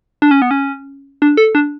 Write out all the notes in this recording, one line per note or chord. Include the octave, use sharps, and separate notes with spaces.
D4
C#4
B3
C#4
D4
A4
D4